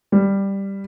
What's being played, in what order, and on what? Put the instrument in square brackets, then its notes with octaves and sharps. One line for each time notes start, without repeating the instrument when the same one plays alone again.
[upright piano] G3